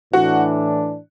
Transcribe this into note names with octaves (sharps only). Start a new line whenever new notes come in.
A2 E3 D4 F#4